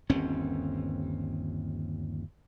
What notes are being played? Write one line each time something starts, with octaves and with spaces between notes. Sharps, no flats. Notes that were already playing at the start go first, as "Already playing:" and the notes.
G1 D#2 C4 C#4